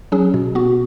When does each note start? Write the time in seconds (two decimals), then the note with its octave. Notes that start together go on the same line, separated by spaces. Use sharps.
0.12 F#3 C#4 G#4
0.34 B2
0.55 B3 F#4